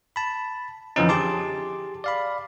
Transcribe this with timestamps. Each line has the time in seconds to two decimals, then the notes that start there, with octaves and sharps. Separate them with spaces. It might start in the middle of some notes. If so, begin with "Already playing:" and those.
0.16 A5 B5
0.96 F2 D3 E3 F3 C#4 D#4
1.09 G4 G#4 A5 C6 D6
2.04 D5 F5 B5